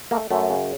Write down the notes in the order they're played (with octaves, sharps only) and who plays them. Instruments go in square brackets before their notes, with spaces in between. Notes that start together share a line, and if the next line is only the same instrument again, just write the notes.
[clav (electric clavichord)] A3 A#3
F#2 A3
C#3